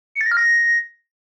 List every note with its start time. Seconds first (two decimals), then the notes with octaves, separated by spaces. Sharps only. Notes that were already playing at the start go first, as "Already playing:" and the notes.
0.15 C#7
0.21 A6
0.26 A#6
0.31 F6
0.37 A#6